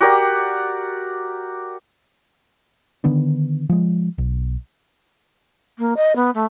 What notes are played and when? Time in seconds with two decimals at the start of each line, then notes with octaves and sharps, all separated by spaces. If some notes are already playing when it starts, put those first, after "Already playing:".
0.01 F#4 G4 A#4 D5
3.04 D3 D#3 B3 D4
3.69 F3 G#3
4.18 B1
5.78 A#3
5.97 D#5
6.16 B3
6.34 A3